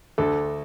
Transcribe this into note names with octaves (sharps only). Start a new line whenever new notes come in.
D2 D3 A3 A4